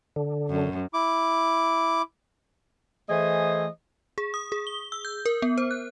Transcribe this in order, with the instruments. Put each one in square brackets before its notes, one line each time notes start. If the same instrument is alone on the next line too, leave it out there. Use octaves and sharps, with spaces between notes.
[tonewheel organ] D3
[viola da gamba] F#2
[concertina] E4 D6
[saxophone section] E3 A3 G#4 C5 D#5
[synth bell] G#4
D#6
G#4
G7
E6
G6
A#4
B3
C5
F#6